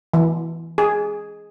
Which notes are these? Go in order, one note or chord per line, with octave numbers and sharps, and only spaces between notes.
E3
G#4